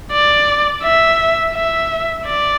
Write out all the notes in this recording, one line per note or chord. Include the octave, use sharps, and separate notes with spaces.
D5
E5
E5
D5